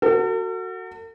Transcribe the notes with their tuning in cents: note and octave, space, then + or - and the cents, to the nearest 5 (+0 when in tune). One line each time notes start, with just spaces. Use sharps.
F#4 +0 A4 +45